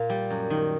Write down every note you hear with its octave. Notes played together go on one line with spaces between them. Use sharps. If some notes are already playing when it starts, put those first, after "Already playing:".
Already playing: A#2 F5
G3
F#2
D#3